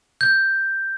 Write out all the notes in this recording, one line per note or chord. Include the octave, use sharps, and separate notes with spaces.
G6